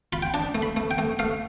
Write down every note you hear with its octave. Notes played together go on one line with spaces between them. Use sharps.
F4 B5
G5
D4 A5
A3
B5
A3
G5
A3
A3 F5